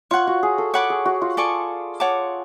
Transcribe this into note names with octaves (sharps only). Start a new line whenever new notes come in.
F4 C#5 F#5 C#6
F#4
G#4
A4
C#5 F#5 B5 D6
G#4
F#4
F4
A4 D5 G#5 C#6
C#5 F#5 A5 D6